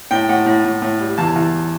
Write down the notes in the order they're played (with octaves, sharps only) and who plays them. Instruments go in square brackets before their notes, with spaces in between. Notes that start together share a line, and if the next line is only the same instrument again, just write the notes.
[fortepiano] A2 G5
A2 F#5
A2
A2
A2
G3
E2 A5
E2